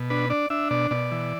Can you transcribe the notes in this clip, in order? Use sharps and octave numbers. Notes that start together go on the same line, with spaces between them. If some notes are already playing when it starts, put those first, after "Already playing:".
Already playing: B2
D4 B4
D4 D5
D4 E5
B2 D5
B2 D5
E3